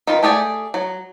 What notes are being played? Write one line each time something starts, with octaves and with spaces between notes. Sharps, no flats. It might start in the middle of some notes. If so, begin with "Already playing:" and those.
D#3 F4 B4
A3 G4 G#4 D5
F#3